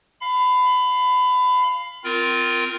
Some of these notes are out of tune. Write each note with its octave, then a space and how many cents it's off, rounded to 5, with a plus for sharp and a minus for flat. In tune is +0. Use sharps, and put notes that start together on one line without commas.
F5 +0 B5 +25
C4 -25 F4 +0 A#4 +0